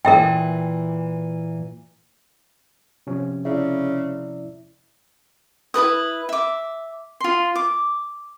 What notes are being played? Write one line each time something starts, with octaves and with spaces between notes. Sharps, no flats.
A#2 E3 A#4 E5 G5
C3 F3 C#4
C#3 E4 D5 E5
E4 A4 B4 D#6
E5 D6
F4 C6
D6